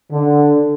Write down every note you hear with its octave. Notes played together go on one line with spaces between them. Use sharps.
D3